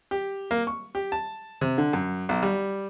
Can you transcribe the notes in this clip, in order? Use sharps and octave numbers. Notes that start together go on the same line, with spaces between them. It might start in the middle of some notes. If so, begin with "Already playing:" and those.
G4
A#3
C#6
G4
A5
C3
D3
F#2
B1
G3